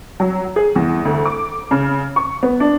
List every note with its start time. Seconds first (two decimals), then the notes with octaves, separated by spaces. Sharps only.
0.20 F#3
0.56 G#4
0.76 E2
1.05 D2
1.25 D6
1.71 C#3
2.16 C#6
2.43 B3
2.60 D4